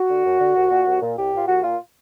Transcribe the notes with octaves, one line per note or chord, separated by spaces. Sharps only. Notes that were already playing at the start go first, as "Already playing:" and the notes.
Already playing: F#4
D3
F#2
D3
C2
A#2
C2
A#2
C2 G4
A#2 F4
C2 F#4
A#2 F4